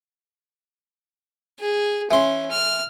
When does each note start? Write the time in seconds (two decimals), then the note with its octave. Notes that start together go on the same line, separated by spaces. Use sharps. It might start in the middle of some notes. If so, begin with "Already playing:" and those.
1.60 G#4
2.11 E3 C#4 C6
2.51 F6